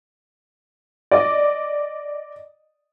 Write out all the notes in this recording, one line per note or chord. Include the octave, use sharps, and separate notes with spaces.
D5 D#5